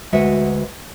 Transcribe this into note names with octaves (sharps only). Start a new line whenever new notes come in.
D2 G#3 F#4 B4 E5 F#5